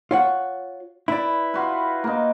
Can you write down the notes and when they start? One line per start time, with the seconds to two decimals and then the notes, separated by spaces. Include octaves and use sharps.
0.11 F4 C#5 F#5
1.08 E4 B4 D5
1.54 F4 F#4 B4
2.04 A#3 D#4